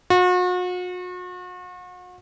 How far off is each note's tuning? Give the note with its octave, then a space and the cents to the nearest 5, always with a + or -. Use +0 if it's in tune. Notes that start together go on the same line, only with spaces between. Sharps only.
F#4 -40